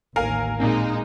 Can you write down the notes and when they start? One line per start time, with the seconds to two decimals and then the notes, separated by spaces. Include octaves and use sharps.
0.16 A1 D#2 A#4 F5 G#5
0.60 A#2 G#3 A#3 C4 D#4